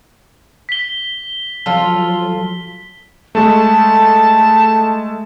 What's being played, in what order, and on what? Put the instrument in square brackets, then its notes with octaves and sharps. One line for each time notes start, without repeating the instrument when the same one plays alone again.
[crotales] B6 G7
[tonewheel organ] F3 F#3 [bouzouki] F4 A4
[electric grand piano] G#3 A3 [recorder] A5